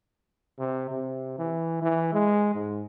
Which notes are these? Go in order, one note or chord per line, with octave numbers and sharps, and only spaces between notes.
C3
C3
E3
E3
G#3
G#2